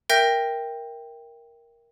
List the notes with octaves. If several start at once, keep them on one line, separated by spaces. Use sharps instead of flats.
A#4 E5 G5 G6 A#6 D7